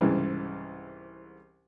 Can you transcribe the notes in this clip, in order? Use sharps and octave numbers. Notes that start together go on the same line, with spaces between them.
C2 G#2 C#3 E3